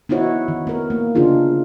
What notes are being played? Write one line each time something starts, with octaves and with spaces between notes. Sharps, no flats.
B3 D#4 E4 F#4 C#5
D#3
B3 A#4
A#3
C#3 A#3 D4 D#4 F4 G#4